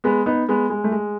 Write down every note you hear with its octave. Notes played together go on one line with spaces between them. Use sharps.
G#3 B3
B3 D#4
G#3 B3
G#3
A3
G#3